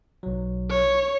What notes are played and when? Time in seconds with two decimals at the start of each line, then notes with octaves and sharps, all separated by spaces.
0.23 B1 F#3
0.69 C#5